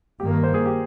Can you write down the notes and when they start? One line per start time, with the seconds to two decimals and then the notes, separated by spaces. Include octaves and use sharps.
0.20 G2 D#3 A#3 G4
0.31 A#4
0.43 C5
0.54 G#4
0.66 G4